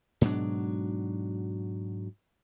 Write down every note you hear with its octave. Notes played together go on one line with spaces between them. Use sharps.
G#2 B2 F#3 D4